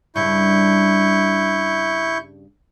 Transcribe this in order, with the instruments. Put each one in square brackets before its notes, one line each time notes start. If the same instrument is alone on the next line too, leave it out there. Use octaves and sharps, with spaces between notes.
[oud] G2 C#3 [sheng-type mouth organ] E4 C#6 G6